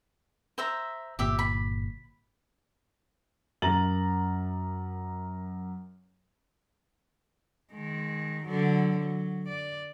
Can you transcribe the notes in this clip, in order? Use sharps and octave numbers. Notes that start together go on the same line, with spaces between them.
C5 E5 A#5
G1 A#2 G4 E5
B5
F#2 A#4 A#5 A6 F#7
D#3 G#3
D3 F#3
F#3
D5